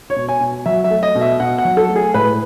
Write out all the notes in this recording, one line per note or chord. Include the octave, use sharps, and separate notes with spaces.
C#5
B2
G#5
B2
F#3 E5
E5
A3
D#5
B2
E5
B2 F#5
F#5
F#3
A4
A3
G#4
A2 B4